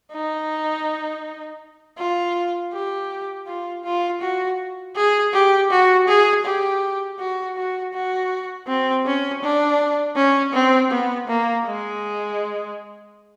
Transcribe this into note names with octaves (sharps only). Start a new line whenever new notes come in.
D#4
F4
G4
F4
F4
F#4
G#4
G4
F#4
G#4
G4
F#4
F#4
F#4
C4
C#4
D4
C#4
C4
B3
A#3
G#3